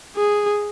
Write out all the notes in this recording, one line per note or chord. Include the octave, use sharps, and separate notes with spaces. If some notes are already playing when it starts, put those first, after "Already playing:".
G#4